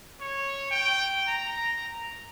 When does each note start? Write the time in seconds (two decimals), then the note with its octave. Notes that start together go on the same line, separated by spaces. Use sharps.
0.20 C#5
0.71 G5
1.28 A#5